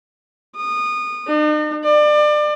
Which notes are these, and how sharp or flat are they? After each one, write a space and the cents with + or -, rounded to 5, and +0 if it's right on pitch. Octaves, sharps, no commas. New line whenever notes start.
D#6 -25
D#4 -45
D5 +30